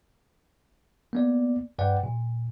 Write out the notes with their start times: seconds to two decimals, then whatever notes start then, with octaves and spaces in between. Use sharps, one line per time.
1.13 A#3 B3 D5
1.79 G2 B4 D5 F#5 G5
2.03 A#2